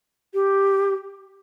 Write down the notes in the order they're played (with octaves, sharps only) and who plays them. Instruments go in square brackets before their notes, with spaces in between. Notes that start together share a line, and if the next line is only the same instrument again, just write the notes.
[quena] G4